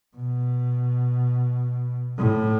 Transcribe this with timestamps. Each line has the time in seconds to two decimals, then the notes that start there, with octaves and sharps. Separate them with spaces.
0.16 B2
2.18 A2